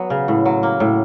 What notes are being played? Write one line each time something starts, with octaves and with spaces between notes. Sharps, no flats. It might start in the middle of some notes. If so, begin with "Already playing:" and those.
Already playing: F#3 B3
C#3
A2
F#3
A#3
A2